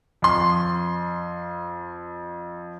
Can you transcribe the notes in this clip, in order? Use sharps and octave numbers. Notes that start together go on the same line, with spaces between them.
F2 C6